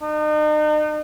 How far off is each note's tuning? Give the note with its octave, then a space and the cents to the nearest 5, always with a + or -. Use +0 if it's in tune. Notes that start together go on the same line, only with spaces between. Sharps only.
D#4 -40